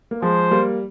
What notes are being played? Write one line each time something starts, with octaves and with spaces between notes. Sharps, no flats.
A#3
F3 G#3 C5
G3 A#3